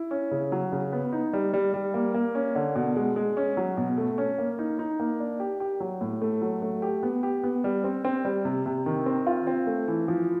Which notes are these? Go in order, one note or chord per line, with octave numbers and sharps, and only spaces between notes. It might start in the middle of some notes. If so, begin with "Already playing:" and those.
Already playing: E4
C#4
C#3
F#3
C#3
B3
D#4
G3
G3
G3
A#3
A#3
C#4
D3
B2
G#3
G#3
C#4
F#3
B2
A3
C#4
A#3
D#4
D#4
A#3
D4
G4
G4
F#3
A2
A3
F#3
A3
G4
B3
G4
B3
G3
C4
C4
G3
C3
C3
D#3
C4
F4
C4
A3
E3
F3